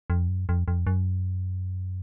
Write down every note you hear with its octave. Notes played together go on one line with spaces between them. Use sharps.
F2
F#2
F2
F2
F#2